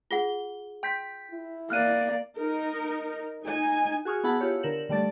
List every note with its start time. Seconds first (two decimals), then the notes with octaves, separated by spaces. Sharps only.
0.11 F4 G#4 F#5 G7
0.83 G5 C6 G6 B6
1.31 E4
1.70 A#3 D5 F6 F#6 D#7
2.38 D#4 A#4
3.44 D#4 G#5
4.05 F#4 G#4 G#5 C#6 D#6 F6
4.23 B3 E4 G#4 F#5 A5 B5
4.40 E4 F4 G4 C#5
4.63 D3 A#4 E7 F#7
4.89 D3 G3 A3 D5 A6